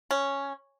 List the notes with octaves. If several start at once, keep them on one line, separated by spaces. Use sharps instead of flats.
C#4